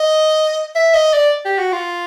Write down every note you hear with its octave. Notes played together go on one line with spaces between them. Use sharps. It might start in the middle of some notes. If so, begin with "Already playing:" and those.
Already playing: D#5
E5
D#5
D5
G4
F#4
F4